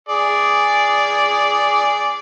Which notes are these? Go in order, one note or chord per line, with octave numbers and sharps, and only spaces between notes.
G#4 D5